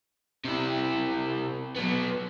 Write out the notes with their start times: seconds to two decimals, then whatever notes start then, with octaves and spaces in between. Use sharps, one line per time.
0.45 C3 E4
1.76 F#3 B3